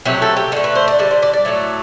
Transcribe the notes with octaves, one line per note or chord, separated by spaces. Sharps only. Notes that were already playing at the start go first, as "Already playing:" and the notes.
C3 F#3 A3 G4
A4
G4
D3 A3 A4
B4
C5
D5
D3 G3 D5
C5
D5
D5
A2 F#3 A3